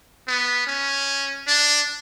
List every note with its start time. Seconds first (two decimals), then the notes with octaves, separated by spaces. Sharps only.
0.28 B3
0.67 C#4
1.46 D4